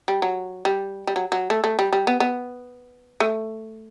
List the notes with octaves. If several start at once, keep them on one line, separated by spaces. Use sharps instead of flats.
G3
F#3
G3
G3
F#3
F#3
A3
A3
G3
G3
B3
B3
A3